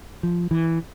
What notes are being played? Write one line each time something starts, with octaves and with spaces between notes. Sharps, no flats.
F3
E3